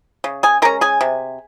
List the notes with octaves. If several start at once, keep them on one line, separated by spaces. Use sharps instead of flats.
C#3
G#4 G#5
G#3 C#4 A#4 A#5
G#4 G#5
C3